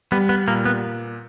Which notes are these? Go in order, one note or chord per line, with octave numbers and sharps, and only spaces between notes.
G3 B3
B3
A#2 A#3
B3